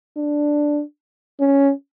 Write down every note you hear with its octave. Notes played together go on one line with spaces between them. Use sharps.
D4
C#4